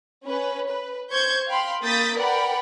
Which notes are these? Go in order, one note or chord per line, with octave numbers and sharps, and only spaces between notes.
C#4 B4
B4
C5 C#6 G6 G#6
F5 G5 B5 C6
A#3 B5 D#6 G6 A6 B6
A#4 B4 D5 F#5 G5 B5